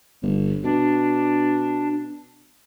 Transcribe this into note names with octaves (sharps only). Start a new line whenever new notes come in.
G1
B2 D4